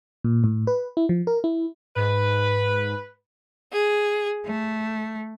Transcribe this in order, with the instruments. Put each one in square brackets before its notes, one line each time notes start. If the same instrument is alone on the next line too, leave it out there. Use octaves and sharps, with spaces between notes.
[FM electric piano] A#2
A2
B4
E4
F3
A#4
E4
[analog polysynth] G#2 [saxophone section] B4
[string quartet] G#4
A3